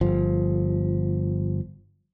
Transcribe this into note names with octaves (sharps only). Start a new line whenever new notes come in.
G1 F3